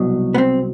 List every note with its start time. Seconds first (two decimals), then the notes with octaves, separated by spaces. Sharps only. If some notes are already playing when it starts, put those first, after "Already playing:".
Already playing: C2 B2 F#3
0.34 B3
0.38 C4